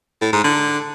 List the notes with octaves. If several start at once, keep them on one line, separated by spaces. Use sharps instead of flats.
A2
G#2
D3